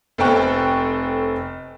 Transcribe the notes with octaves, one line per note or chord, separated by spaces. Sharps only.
F1 C4 A4 G5 C#6 F#6